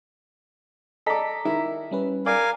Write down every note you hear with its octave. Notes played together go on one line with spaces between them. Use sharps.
A4 D5 D#5 A#5 B6
D#3 E4
G3 C#4 B4
A#4 D5 F5 G#5